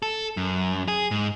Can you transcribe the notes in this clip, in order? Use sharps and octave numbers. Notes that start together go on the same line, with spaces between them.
A4
F#2
G#4
G#2